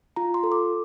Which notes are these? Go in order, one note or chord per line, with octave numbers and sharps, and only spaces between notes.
F4 A#5
C6
A4
D6